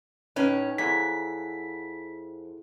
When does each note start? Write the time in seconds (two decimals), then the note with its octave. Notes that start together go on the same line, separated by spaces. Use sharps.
0.36 A2 C#4 D#4 B4
0.78 F2 E4 G#4 A4 F#5 G#5 A#5 B6